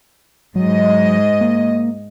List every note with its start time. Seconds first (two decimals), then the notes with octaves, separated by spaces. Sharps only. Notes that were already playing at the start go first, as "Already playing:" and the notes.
0.56 G#2 F#3 D#5
1.41 A#3